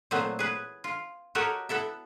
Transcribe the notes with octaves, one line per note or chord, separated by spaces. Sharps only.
A#2 E3 F#3 A3 B3 C4
G#4 B4
F4
F#4 G4 A4 A#4 C#5 D#5
B3 E4 A4 E5